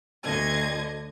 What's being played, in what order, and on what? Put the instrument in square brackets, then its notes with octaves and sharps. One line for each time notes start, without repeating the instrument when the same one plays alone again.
[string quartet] D2 D3 D#5 G#6